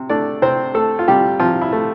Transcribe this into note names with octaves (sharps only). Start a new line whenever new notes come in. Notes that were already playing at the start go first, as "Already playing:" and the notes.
Already playing: C3
A3 D4 D5
C3 C4 C5
A3 A4
F4
C3 G3 G4
C3 F3 F4
E4
A3